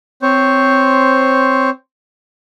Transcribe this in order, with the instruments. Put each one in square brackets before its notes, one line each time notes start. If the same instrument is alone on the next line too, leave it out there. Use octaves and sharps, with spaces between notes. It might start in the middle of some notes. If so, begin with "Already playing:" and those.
[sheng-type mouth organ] C4 C5 C#5